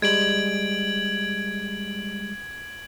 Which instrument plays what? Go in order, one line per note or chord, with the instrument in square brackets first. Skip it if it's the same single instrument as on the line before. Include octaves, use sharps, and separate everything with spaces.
[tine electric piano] G3 G#3 [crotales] G#6 D7 F#7